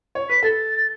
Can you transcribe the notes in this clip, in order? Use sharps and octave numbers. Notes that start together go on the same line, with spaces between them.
C#5
B4 B6
A4 A6